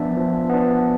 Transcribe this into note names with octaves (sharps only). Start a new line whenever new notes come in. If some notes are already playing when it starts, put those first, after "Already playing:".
Already playing: F3 B3 D4 E5
F3
B3 D4